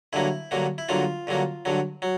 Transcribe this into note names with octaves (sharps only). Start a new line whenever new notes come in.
G2 D3 F#3 A#3 E4
G2 D3 F#3 A#3
E4
G2 D3 F#3 A#3 F4
G2 D3 F#3 A#3
G2 D3 F#3
F#3